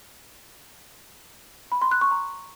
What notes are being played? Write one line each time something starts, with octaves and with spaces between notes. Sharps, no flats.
B5
C6
F#6
C#6
A#5